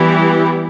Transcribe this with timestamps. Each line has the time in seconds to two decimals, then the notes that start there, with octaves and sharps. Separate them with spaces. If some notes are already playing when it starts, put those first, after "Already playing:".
Already playing: E3 G3 B3 E4 G4